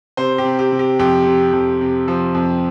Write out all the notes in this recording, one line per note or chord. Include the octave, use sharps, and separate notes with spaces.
C3 C5
G4
C3
G4
C3
G4
F2 G4
C3
F2
C3
F3
F2